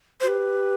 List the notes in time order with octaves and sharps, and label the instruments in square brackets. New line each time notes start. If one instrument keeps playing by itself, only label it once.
[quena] F#4 [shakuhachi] C5
[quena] G4 [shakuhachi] B4